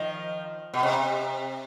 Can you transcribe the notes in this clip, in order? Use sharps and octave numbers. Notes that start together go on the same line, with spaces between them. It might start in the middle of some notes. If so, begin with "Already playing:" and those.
Already playing: D#3 F3
B2
C3